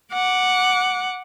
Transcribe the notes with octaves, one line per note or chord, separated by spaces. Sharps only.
F#5 D6